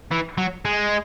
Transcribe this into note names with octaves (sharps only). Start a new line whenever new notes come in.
E3
F#3
G#3